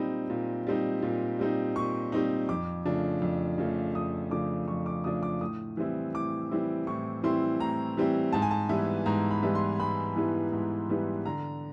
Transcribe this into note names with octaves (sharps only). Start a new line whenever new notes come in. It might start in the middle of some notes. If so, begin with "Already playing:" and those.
Already playing: A#2 G3 C4 D#4 B5
A#2
G3 C4 D#4
A#2
G3 C4 D#4
A#2 C#6
G3 C4 D#4
F2 D6
C#3 F3 A3 D4
F2
C#3 F3 A3 D4
F2 D#6
C#3 F3 A3 D4 D6
F2 C#6
D6
C#3 F3 A3 D4 D#6
D6
A2 D#6
E3 G3 C4 E4
A2 D6
E3 G3 C4 E4
A2 C#6
E3 G3 C4 E4 C6
A2 A#5
E3 G3 C4 E4
G#2 A5
G#5
A5
E3 G3 B3 E4
G#2 A#5
B5
E3 G3 B3 E4
C6
G#2 B5
E3 G3 B3 E4
G#2
E3 G3 B3 E4
D3 A#5